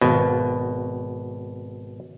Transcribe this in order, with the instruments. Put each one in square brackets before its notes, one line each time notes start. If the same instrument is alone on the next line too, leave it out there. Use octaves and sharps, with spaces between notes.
[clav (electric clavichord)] G#1 B2